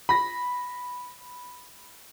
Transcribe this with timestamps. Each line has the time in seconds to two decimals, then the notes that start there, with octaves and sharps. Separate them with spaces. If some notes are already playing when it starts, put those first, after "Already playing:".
0.09 B5 A#6